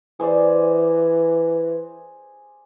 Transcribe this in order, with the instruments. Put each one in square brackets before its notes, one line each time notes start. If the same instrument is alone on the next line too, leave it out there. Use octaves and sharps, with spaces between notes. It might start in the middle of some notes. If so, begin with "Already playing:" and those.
[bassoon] E3 [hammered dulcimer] G#4 C5 D5